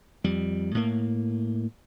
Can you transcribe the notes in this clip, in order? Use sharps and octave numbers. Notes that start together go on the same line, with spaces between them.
F2 G3
A2 A#3